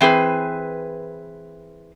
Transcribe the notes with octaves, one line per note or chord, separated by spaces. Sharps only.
E3 C4 G#4 B4